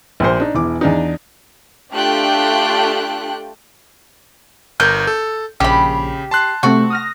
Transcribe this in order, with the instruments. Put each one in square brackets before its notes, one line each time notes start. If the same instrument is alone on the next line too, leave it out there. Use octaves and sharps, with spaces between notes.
[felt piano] A#1 A#2 C5
D4 D#4
E1 E3 D6
E2 D4 D#4
[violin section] A3 D4 F4 G4 G5 F#6
[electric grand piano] G1 A#4 [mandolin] G6
[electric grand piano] A4
[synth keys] A#1 [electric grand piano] C#3 [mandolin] G4 B5
[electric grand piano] A5 C6 F#6 [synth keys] C7
[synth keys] C3 A3 C4 [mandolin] F#4
[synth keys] D#6 F6 A#6